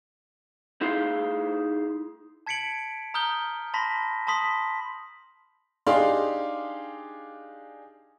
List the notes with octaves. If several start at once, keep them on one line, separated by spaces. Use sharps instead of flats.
D#4 E4 G#4 F5 C6
A5 G#6 B6 C#7 D7 F#7
A#5 D#6 F6 G6 G7
A5 B5 C6 A#6 B6
A5 B5 C6 D#6 B6 F#7
D4 D#4 G4 G#4 F5 C6